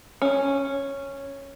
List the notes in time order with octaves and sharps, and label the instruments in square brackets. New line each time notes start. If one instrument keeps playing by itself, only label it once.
[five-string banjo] C#4